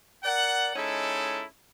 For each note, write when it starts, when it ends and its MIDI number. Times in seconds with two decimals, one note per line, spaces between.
0.24 0.73 70
0.24 0.73 74
0.24 0.73 78
0.76 1.44 56
0.76 1.44 61
0.76 1.44 63
0.76 1.44 64
0.76 1.44 69